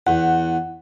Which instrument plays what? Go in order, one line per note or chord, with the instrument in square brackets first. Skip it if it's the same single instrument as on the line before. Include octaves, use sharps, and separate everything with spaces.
[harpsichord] E2 [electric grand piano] F#5